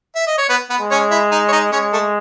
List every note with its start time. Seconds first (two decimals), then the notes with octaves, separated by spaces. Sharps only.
0.16 E5
0.27 D#5
0.38 C#5
0.49 B3 B4
0.70 B3 B4
0.80 G#3
0.91 C#4 C#5
1.11 E4 E5
1.32 D#4 D#5
1.48 C#5
1.52 D#4 D#5
1.72 G#3 C#4 C#5
1.93 A3 A4